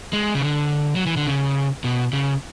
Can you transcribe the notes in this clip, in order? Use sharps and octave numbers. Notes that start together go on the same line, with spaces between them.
G#3
C#3
D3
F#3
E3
D3
C#3
B2
C#3